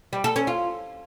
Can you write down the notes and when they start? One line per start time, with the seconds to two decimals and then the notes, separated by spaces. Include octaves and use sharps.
0.13 G3
0.24 A4
0.36 C#4
0.47 F4